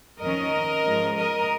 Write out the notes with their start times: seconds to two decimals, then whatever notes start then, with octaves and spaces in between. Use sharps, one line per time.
0.20 F2 D#3 C#4 A#4 D#5
0.84 G#2 F3 G#3 C#4
1.16 A#4 D#5